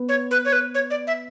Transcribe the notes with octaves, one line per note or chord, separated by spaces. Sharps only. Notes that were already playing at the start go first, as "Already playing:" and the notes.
Already playing: B3
C#5
B4
C#5
B4
C#5
D5
E5